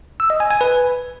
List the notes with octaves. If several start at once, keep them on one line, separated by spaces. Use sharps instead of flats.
E6
D#5
G#5
G#5
B4